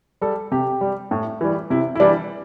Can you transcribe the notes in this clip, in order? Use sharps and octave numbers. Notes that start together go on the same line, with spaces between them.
G3 A4
C3 G4
G3
A2
E3 G3
C3 E4
E4
E3 G3 D4